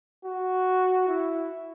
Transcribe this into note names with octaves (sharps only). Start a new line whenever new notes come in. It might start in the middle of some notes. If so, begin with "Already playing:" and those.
F#4
E4